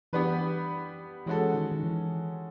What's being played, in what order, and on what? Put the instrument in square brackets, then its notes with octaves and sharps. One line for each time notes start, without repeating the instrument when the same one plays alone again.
[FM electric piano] E3 [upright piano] G3 B3 D4 G4 B4
[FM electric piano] E3 [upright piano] G#3 C#4 F#4 A4
[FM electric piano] D#3
D#3
E3